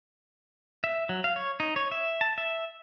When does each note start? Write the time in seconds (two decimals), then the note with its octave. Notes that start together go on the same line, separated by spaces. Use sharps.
0.84 E5
1.09 F#3
1.24 F5
1.36 C#5
1.60 D#4
1.76 C#5
1.92 E5
2.21 A5
2.38 E5